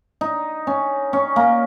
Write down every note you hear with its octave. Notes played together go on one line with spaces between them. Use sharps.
D#4
C#4
C#4
A#3